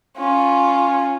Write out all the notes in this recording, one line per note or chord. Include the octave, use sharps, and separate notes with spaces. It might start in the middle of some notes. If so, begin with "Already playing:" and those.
C#4 F4